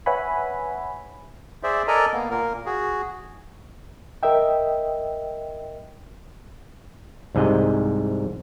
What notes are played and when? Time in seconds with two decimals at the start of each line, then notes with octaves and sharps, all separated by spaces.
0.06 B4 C#5 E5 F#5 G#5 B5
1.63 G#4 C5 D5 E5
1.88 A4 A#4 D5 D#5 G#5 A#5
2.13 A#3 B3
2.30 A#2 A#3 A#4
2.66 F#4 G#4
4.23 A#4 D#5 E5 G5
7.35 C2 G#2 C3 D#5